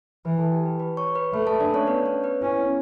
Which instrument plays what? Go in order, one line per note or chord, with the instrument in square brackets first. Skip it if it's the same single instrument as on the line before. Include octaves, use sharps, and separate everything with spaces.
[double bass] E3 [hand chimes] B4 B5
[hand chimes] A4 A5
G4 G5
B4 B5
B4 B5
C#5 C#6
B4 B5
[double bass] A3 [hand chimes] B4 B5
[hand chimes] A4 A5
D4 D5
C#4 C#5
B3 B4
C#4 C#5
B3 B4
[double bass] C#4 [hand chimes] E4